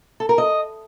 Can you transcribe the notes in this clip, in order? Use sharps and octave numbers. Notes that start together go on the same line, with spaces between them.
A4
A#4
D#5